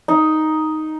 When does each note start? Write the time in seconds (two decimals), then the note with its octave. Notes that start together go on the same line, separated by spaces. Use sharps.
0.08 D#4